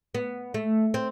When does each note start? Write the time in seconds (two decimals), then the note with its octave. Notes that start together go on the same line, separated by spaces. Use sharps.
0.15 B3
0.54 A3
0.94 C4